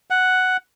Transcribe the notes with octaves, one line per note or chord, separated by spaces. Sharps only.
F#5